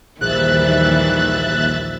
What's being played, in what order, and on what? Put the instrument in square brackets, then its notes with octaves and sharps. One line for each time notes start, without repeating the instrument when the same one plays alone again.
[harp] A#1 [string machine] D#2 E5 A6 [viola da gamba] D#3 E3 G3 [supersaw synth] F#6